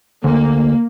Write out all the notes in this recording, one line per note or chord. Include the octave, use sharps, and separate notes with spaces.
D2 A#3